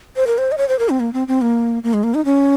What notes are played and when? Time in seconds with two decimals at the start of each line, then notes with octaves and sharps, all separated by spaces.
0.16 C5
0.27 A#4
0.38 C5
0.52 D#5
0.58 C#5
0.68 C5
0.79 A#4
0.89 C4
1.00 A#3
1.13 C4
1.28 C4
1.41 A#3
1.84 A#3
1.94 G#3
2.03 A#3
2.14 D#4
2.25 C#4